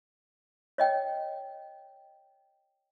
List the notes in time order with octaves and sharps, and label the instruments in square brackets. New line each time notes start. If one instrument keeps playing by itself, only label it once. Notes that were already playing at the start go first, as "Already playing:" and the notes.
[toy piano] C#5 D#5 G5